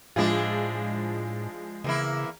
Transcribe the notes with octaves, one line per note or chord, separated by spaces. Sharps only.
A2 F3 G#3 D4 E4 G#4
E2 C#3 A#3 E4